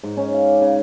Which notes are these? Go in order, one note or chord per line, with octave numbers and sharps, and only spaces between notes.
G#2
C#4
F5
D6
C#3